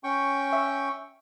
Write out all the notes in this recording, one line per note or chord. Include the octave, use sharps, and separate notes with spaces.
C#4 G5 C#6
E5